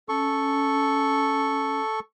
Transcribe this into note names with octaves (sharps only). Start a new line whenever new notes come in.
C#4 A4 C#6